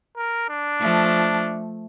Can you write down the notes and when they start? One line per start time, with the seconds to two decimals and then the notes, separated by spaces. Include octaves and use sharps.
0.17 A#4
0.49 D4
0.80 F3 A3